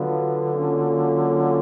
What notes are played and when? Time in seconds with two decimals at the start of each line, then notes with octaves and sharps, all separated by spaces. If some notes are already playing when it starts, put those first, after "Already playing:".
Already playing: D3 F#3 B3 D4 F4
0.55 F#3 A#3 C#4 F4